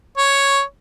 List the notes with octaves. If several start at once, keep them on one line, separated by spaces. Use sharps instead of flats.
C#5